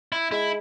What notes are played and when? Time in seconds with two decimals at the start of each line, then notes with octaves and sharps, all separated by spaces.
0.12 E4
0.31 G#3 E4